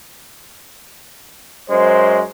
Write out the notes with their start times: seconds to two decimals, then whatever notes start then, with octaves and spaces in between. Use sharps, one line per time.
1.71 F#2 G#3 C5